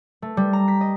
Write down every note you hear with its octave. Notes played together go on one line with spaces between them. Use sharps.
A3
G3
A#5
B6
D#5